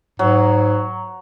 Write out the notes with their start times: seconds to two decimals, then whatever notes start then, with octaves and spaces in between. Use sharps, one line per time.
0.19 G#2 F#3